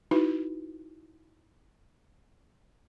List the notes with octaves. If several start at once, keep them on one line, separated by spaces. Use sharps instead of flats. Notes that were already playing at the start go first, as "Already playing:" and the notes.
D#4 E4 F#4 B4